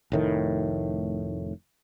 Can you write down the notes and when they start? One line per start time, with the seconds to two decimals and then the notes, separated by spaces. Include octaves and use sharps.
0.12 F1 A2 D#3